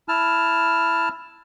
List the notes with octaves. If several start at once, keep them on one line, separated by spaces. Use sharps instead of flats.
E4 A5 F6